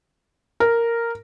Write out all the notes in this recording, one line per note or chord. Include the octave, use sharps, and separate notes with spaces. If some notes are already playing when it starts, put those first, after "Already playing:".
A#4